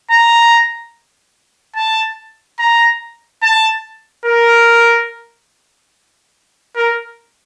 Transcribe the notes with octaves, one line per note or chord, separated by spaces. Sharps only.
A#5
A5
A#5
A5
A#4
A#4